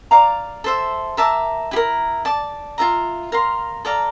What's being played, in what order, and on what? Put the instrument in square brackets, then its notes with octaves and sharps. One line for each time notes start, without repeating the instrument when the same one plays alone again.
[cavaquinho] D5 F5 A#5 D6
A4 C5 E5
A#4 E5 A5 D6
E4 G4
A#4
D5 A5 D6
F4 A#4 E5 A#5
A#4 F5 C6
A4 D5 F5 A#5